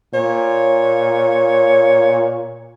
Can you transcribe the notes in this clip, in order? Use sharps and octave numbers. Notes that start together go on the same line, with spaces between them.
A#2 C#5